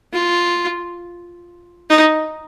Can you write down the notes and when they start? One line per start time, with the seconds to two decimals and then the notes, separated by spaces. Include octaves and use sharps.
0.13 F4
1.90 D#4